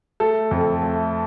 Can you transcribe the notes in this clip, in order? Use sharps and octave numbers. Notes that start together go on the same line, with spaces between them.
A3 A4
F2
A3